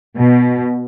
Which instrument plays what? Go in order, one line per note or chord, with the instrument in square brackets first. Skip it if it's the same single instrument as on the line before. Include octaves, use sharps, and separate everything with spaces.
[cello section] B2